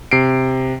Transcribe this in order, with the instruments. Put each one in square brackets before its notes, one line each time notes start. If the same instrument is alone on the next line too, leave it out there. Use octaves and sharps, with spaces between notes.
[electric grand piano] C3 C7 D7